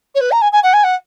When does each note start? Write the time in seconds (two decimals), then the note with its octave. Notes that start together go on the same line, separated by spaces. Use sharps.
0.15 C#5
0.21 B4
0.32 A#5
0.42 G#5
0.52 G#5
0.63 F#5
0.73 G#5
0.84 F#5